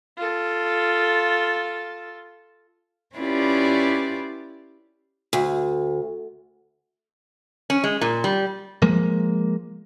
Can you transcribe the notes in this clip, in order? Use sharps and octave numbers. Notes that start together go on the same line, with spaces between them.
F4 A4
C#4 E4 F4 G4 B4 D5
D2
C#4
G#3
A#2
G3
F3 G#3 A#3